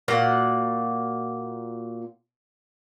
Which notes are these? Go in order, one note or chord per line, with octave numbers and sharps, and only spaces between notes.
A#2 A#3 F#4 F#5